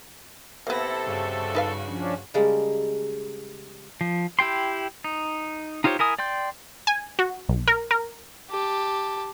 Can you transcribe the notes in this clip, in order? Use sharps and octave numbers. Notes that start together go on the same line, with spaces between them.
C3 A#3 B3 E4 A4 A#6
G2 C#3 F#4
D#4 B4 F5
F3 C#4 D4
C#3 G3 G#3 A#3 A4
F3
E4 G4 G5 C6
D#4
D#4 F4 G4 C5 C#5
E4 A#4 G#5 D#6
D5 G5 C6 G6
G#5
F#4
B1
A#4
A#4
G4 A5